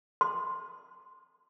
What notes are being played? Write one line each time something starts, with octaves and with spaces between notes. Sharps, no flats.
C6